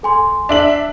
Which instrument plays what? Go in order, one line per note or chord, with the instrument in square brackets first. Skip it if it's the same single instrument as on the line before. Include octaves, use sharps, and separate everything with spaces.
[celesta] A4 G#5 C6
[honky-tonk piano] D4 E5 F#7